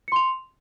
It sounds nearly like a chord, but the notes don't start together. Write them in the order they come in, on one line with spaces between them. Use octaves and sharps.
C#7 C6 F7